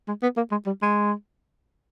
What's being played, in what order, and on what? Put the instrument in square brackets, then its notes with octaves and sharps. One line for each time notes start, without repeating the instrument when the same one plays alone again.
[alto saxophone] G#3
B3
A#3
G#3
G3
G#3